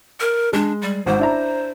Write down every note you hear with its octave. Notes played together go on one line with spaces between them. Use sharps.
A#4
G#3 D4
G3
G#1 G#2 C5
D4 E4 A#5